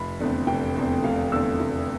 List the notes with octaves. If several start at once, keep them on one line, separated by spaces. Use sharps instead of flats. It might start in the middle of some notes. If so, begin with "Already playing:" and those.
Already playing: F1 B5
E2 D3 A3 C4
F1 G5
E2 D3 A3 C4
F1 F5
E2 D3 A3 C4 E6
F1